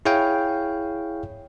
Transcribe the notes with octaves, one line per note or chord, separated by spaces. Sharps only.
E4 G#4 C#5 F5 G5